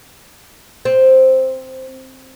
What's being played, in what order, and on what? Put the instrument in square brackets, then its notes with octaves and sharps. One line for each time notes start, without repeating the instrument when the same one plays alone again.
[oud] C4